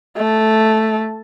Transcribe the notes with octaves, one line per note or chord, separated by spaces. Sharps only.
A3